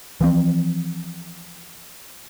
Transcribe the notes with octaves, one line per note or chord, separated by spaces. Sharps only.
E3 F3 C4